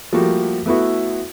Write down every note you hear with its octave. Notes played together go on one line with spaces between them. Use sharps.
F3 G3 A3 A#3 F#4 G4
A3 B3 E4 F#4